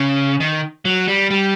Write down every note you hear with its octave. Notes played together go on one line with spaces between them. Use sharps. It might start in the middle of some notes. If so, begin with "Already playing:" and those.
Already playing: C#3
D#3
F#3
G3
G3